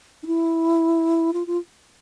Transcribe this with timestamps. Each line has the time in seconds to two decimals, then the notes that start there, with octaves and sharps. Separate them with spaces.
0.23 D#4
0.27 E4
1.33 F4
1.47 F4